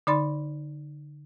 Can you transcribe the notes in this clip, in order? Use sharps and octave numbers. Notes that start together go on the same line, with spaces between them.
D3 D#4 D5 B5 C6 A6